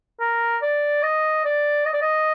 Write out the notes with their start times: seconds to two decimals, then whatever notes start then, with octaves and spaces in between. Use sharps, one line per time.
0.20 A#4
0.62 D5
1.03 D#5
1.45 D5
1.86 D#5
1.93 D5
2.02 D#5